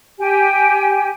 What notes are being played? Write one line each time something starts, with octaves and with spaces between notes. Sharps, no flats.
G4 G5 G#5